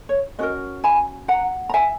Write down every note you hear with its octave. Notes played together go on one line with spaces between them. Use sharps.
C#5
C#4 F#4 A#4 B4 D#5
G#5 B5
F#5 A#5
A#5
E5 G#5